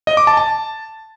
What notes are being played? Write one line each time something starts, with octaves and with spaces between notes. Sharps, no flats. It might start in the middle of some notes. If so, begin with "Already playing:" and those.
D#5
D6
A5
A5